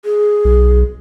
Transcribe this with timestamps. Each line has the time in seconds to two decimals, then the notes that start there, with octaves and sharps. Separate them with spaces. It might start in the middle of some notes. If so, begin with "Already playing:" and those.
0.05 G#4
0.45 B1